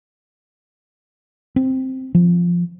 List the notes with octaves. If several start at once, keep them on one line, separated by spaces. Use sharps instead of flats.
C4
F3